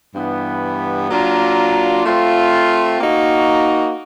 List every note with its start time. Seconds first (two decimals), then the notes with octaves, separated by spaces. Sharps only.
0.14 G2 E3 G3 B3
1.09 F#3 A#3 D4 F4 A#4
2.05 A3 C4 F4
2.99 A#3 D#4 F#4